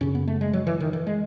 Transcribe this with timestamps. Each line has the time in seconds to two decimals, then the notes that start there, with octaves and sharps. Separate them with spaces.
0.01 F#2 C#3 C#4
0.15 B3
0.28 A3
0.41 G#3
0.53 F#3
0.67 E3
0.80 D#3
0.93 E3
1.07 G#3